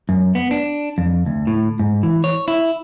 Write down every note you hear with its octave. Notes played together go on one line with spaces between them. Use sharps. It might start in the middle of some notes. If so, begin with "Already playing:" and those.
F#2
B3
D4
F2
D2
A2
G#2
E3
C#5
E4